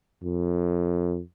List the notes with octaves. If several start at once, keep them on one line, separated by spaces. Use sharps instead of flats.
F2